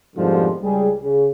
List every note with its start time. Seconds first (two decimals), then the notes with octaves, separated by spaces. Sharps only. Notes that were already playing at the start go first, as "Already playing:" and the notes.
0.16 F2 G#2 B2 D3 F3 G3
0.62 C#2 G3 G#4
1.01 C#3